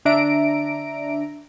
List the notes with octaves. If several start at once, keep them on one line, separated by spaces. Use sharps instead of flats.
D3 D4 E5 A#5 D7